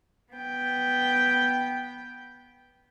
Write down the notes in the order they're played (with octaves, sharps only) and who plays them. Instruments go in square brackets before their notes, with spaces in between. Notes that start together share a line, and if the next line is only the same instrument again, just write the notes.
[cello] B3 G5